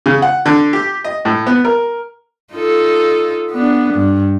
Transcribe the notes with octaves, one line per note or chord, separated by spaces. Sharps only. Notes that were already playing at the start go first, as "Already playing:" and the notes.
C#3
F#5
D3
G4
D#5
A2
B3
A#4
D#4 F4 A4
B3 D4
G2